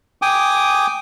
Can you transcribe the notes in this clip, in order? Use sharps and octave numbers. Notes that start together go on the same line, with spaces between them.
G5 G#5 D6 D#6